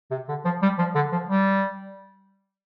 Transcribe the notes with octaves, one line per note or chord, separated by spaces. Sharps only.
C3
D3
F3
G3
F3
D3
F3
G3